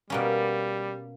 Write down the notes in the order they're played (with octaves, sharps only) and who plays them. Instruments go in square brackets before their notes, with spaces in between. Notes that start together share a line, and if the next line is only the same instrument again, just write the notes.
[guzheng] B2 A#3 C#4 [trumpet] G3